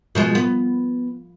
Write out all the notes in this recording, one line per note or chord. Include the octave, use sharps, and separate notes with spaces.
B2 F3 G#3
B3